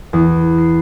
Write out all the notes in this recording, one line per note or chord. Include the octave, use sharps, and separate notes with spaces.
E2
C7